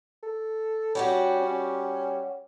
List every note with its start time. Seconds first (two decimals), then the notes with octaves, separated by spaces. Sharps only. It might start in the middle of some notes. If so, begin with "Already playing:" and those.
0.23 A4
0.95 G3 C#4 F#4 G4
1.42 C#4